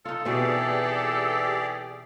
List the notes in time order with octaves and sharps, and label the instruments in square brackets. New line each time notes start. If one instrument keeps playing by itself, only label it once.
[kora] D#4 F4 [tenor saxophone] A4
[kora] B2 C4 [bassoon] E3 [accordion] G4 G#4 D5